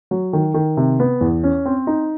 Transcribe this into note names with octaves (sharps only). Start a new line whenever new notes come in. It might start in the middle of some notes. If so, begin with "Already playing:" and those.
F#3
D#3
D#3
C3
B3
E2
C#4
C4
D#4